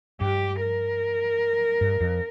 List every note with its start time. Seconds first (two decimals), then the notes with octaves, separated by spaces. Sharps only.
0.21 G2 G4
0.61 A#4
1.81 G2
2.01 F2